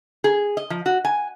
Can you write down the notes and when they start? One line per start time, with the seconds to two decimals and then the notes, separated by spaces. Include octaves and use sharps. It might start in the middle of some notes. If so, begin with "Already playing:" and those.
0.24 G#4
0.57 D#5
0.70 F3
0.86 F#4
1.05 G#5